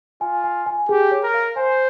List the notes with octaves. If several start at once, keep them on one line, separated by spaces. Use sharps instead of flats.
F4 G#5
G#5
G#5
G4 G#4
C#5
A#4
F5
C5 G#5